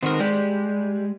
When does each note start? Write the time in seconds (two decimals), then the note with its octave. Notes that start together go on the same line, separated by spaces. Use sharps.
0.03 D#3 B3 C4 A#4
0.20 G3 G#3